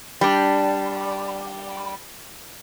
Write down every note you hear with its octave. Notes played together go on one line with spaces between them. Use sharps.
G3 D4